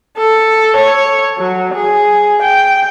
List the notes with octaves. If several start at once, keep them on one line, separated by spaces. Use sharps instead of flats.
A4
C#5
F#3
G#4
G5